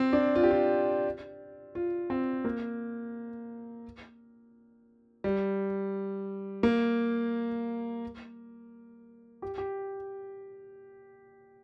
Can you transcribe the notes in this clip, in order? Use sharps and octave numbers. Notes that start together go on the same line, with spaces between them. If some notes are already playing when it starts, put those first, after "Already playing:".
Already playing: C4
D4
F4
G4
F4
F4
C4
A#3
G3
A#3
G4
G4